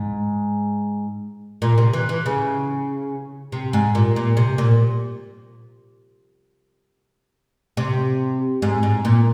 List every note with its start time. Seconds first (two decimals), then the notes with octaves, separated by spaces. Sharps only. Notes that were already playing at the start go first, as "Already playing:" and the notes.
Already playing: G#2
1.62 A#2
1.78 C3
1.93 E3
2.09 E3
2.26 C#3
3.52 C3
3.73 G#2
3.95 A#2
4.16 A#2
4.37 C3
4.58 A#2
7.77 C3
8.62 G#2
8.83 G#2
9.05 A#2